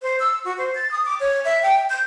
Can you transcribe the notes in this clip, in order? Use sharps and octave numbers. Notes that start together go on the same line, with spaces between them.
C5
E6
F#4
C5
A6
D#6
D6
C#5
E5
G5
G6